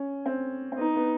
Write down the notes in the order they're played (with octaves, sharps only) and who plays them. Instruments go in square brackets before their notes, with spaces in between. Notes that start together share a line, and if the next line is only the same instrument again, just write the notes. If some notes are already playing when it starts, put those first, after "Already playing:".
Already playing: [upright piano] C#4
C4
C4
[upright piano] B3 [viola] D#4
[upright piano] B3